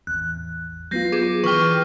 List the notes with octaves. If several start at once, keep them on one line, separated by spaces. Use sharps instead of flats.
A1 E2 F#6
F#3 B3 F4 G6 A#6 C7
G#4 D6
E3 B4 G5 C#6 F6